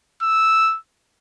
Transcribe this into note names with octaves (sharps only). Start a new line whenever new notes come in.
E6